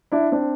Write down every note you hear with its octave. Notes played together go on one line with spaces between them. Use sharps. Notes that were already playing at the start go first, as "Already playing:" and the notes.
D4 E4
C4 D4